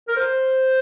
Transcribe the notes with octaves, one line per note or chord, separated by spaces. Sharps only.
A#4
C5